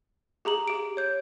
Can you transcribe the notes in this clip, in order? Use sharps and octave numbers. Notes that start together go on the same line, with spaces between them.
G4 G#4 A#5 F#7
G4 D7
C#5 G6